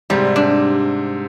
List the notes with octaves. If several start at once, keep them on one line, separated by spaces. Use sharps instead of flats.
G#2 C3 G3
D4